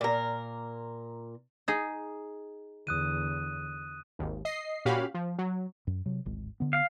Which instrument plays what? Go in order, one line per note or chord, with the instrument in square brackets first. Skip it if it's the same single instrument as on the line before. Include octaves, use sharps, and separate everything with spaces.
[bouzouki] A#2 A#4
[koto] D#4 G#4
[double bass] E2 D3 [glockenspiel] D#6 F#6 D#7
[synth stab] G#1 D#2
D#5 C7
A#2 C#4 F#4 G4 F5 B5
F3
F#3
[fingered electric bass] F#2
C3 F#3
D1 G#1 G#3
D3 B3
[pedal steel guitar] F5